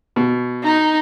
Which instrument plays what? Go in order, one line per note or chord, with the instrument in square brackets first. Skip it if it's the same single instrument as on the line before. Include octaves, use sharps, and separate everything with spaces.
[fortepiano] B2
[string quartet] D#4